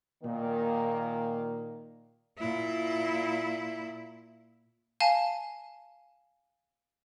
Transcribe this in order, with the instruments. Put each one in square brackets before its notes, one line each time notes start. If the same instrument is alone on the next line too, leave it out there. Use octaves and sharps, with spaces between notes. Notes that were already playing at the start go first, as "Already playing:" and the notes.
[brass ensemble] A#2 D#3 A#3
[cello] A#2 E4
[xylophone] F5 G#5 A5